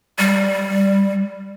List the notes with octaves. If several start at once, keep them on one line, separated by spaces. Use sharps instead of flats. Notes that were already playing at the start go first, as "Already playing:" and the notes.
G3